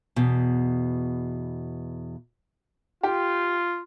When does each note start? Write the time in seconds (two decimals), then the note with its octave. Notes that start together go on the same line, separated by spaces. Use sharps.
0.16 E2 B2
3.03 F4 G4